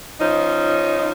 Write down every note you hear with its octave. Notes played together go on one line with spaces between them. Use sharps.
F3 C#4 D#4